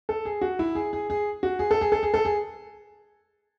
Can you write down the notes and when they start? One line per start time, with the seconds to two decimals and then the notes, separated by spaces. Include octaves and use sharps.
0.09 A4
0.25 G#4
0.41 F#4
0.59 E4
0.75 G#4
0.93 G#4
1.10 G#4
1.43 F#4
1.59 G#4
1.71 A4
1.81 G#4
1.92 A4
2.03 G#4
2.14 A4
2.25 G#4